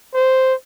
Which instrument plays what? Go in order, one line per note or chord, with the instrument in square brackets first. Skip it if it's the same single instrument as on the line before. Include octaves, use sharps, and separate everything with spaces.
[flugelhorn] C5